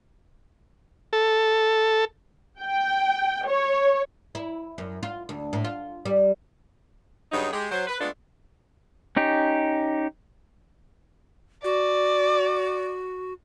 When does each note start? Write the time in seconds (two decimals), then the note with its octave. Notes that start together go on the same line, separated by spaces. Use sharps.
1.13 A4
2.61 G5
3.47 C#5
4.35 E4
4.78 F#2
5.03 F4
5.29 D2
5.53 A2
5.64 F4
6.05 G3
7.32 G2 C#3 F#3 D#4
7.52 G#3 G4 G#4
7.71 F#3 C5
7.87 B4
8.00 G#3 A3 B3 D4 F4 A4
9.17 C#4 D#4 G4
11.64 F#4 D5